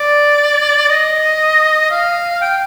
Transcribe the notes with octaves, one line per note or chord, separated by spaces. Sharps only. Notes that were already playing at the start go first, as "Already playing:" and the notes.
Already playing: D5
D#5
F5
G5